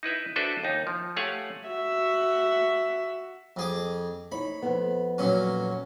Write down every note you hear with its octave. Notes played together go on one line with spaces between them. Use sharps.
D#4 E4 B4 E5
D4 F#4 A4 B4 C5 E5
D#2 D#4
F3
A3 G4 C#5 F5 F#5 G#5
F#4 E5
F2 G#4 D6
D#4 C#5 B5
F2 B3
A#2 F#3 C#4